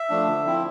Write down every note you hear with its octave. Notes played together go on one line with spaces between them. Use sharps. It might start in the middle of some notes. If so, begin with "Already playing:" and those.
Already playing: E5
F3 A3 D4
D3
F3 C4 E4